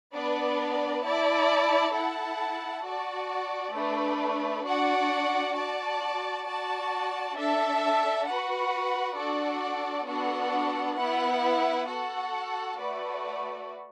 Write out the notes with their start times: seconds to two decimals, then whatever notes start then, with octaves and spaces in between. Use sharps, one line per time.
0.14 B3 D4 B4 D5
1.04 E4 D5 A5
1.94 E4 A4 F#5 A5
2.84 F#4 D5 A5
3.75 A3 D4 B4
4.65 D4 F#4 D5 F#5
5.55 F#4 D5 A5
6.46 F#4 D5 A5
7.36 D4 A4 E5 A5
8.27 F#4 B4 F#5
9.17 D4 F#4 A4 D5 F#5
10.07 B3 D4 F#4 A4 F#5
10.97 B3 E4 B4 F#5
11.88 F#4 A4 F#5
12.78 A3 F#4 B4 D5